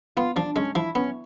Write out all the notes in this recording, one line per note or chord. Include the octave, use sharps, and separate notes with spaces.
B3 F4
F3 D4
G#3 C#4
F3 E4
B3 C#4